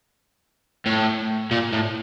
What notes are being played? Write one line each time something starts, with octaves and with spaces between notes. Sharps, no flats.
A2
A#2
A2